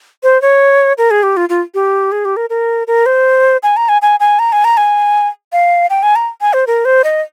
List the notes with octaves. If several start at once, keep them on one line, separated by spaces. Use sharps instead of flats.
C5
C#5
A#4
G#4
G4
F4
F4
G4
G#4
G4
A#4
A#4
A#4
C5
G#5
A#5
G#5
G#5
G#5
A#5
G#5
A#5
G#5
F5
G5
G#5
A#5
G#5
C5
A#4
C5
D#5